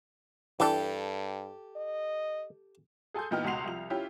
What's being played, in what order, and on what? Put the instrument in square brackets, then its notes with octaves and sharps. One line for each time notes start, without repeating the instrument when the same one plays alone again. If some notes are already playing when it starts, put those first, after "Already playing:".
[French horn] G2 [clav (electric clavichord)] E3 D4 [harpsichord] G4 A4
[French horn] D#5
[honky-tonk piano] G#4 A4 G#5 C6 G6
A#2 E3 B3 D#4 G5 F6
C#2 B2 F#5 C6 C7 F7
C2 F3 F7
C#4 E4 F4 G4